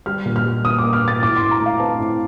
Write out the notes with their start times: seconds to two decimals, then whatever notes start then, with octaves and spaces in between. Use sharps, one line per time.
0.06 G3 F6
0.26 A#2
0.36 F6
0.45 G3
0.64 A#2 D#6
0.79 D6
0.84 A#3
0.93 F6
1.02 A#3
1.08 A6
1.22 A2 D6
1.37 C6
1.42 A2
1.51 A#5
1.61 A3
1.66 F5
1.80 C4 A5
1.99 A2